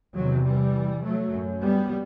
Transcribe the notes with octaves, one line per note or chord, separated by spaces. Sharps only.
E2 C3 D#3 F#3
E3 G3
F#3 A3
F#2
G3 B3